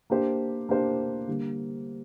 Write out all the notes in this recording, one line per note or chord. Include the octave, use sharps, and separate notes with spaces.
A#3 D4 G4 C5
A#3 D4 G4 C5
D3 G3 A#3